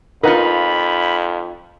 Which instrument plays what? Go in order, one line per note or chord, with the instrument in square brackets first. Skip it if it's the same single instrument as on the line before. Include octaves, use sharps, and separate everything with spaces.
[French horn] F2 [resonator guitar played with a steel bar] D#4 F4 [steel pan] A#4 B4 F#5 [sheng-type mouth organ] B5